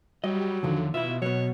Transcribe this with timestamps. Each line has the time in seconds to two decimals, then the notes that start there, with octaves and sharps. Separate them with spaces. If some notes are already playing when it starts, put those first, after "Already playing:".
0.24 F#3 G3 D#5
0.63 E2 D3 D#3 F3
0.94 B2 E4 F4 E5
1.22 B2 F#3 B3 C#5